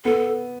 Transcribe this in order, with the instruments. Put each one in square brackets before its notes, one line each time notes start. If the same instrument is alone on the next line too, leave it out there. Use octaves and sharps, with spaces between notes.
[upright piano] B3 [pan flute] A4